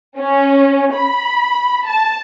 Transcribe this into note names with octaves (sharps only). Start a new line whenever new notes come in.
C#4
B5
A5